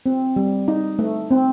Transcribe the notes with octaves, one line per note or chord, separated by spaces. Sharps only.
C4
G3
D#4
A3
C4